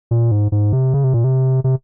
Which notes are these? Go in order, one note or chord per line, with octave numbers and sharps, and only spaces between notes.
A#2
G#2
G#2
C3
C#3
C3
A#2
C3
C3